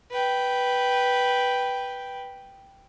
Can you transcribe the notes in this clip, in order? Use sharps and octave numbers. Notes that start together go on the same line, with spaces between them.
B4 G5